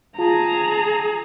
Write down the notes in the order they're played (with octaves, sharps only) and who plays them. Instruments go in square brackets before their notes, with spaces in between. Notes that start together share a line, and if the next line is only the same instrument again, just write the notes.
[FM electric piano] F4 [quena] G#4 [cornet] A5 [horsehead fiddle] A#5